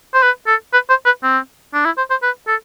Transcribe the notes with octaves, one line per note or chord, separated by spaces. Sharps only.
C5
B4
A4
B4
C5
B4
C4
D4
E4
C5
C5
B4
A4